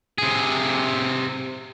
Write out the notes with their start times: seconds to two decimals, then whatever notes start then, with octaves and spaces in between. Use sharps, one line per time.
0.18 C3 G#4